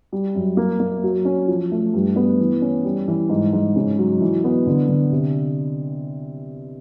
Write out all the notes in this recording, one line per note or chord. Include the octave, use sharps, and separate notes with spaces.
G3
F#2
A#3
A#3
F#3
C#4
F3
A3
G2
B3
E3
C#4
G3
E3
G#2
G#2
C#3
F#3
E3
B3
D3
D3
C3